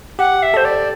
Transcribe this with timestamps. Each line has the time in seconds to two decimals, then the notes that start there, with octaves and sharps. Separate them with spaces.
0.19 G4 F#5
0.42 E5
0.54 A4 C5
0.64 D5